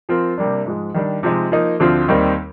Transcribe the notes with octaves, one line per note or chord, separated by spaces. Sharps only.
F3 C4 F4 A#4
C3 G3 A#3 D4
G#2 F3 G#3
D#3 G3 D4
C3 F3 G#3 D#4
F3 A#3 D#4
D2 D3 F3 C4 F4
D#2 D#3 G3 C4